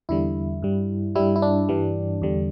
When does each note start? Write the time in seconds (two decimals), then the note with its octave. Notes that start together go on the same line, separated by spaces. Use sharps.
0.09 E2 D3 G3 E4
0.62 G2 G3
1.15 G2 G3 E4
1.36 E4
1.42 D4
1.69 G2 E3 G3
2.22 E2 D3 G3